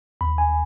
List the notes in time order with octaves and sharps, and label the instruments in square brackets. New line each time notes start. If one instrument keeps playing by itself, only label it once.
[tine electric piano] D#2 B5
G#5